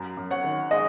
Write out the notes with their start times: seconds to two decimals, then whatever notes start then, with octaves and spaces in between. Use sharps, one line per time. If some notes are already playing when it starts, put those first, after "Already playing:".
Already playing: F#2
0.17 F#2
0.31 C#5 F#5
0.44 D#3
0.71 G#3 D#5